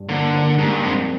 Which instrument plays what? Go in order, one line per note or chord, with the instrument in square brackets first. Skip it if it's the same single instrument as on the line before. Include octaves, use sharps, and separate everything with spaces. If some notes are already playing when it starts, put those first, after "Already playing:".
Already playing: [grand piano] G2
[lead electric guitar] D3 [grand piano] A#3
[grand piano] A#3
[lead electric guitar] G#2 [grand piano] G3
[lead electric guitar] G2
[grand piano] F2 [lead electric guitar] G#2